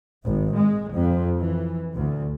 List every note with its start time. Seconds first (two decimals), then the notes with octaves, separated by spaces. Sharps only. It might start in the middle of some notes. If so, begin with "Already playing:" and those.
0.24 G#1
0.56 G#3
0.93 F2
1.41 E3
1.95 D2